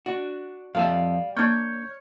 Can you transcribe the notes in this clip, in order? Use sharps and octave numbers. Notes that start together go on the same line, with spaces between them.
D4 F#4
F2 G3 A4 E5 F5
A#3 D4 C#5 C#6 F6 G6 G#6